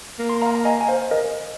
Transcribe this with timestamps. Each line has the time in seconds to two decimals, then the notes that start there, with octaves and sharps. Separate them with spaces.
0.19 A#3
0.29 C6
0.42 F5 A#5
0.55 A#5
0.65 D#5 G#5
0.81 G#5
0.88 C5 F5
1.11 A#4 D#5